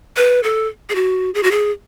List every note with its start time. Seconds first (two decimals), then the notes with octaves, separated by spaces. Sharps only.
0.17 B4
0.44 A4
0.89 G#4
0.95 F#4
1.34 G#4
1.43 F#4
1.51 G#4